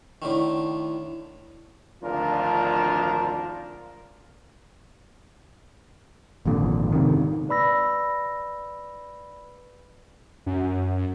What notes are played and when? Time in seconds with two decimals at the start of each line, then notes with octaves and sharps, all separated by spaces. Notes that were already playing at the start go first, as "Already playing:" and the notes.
0.22 A2 D3 D#3
2.02 G#1 D2 F3 D4 F4 A#4
6.46 G#1 F2 A#2 D3
6.92 G#2 C3 D#3
7.49 B4 D5 B5 E6 A#6
10.46 F#2